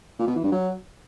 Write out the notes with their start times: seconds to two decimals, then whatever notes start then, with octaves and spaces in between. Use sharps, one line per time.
0.19 A#2
0.27 B2
0.36 E3
0.44 G2
0.52 F#3